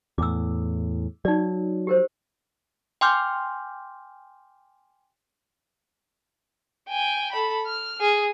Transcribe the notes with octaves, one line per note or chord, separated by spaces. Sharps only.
E2 A2 D6 E6
F#3 D#4 D5
G4 A#4 C5
G5 G#5 C6 D6 F6 G6
G5 G#5
A4 B5
F6
G#4